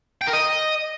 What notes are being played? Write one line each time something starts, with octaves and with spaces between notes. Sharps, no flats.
G5
A#4
D#5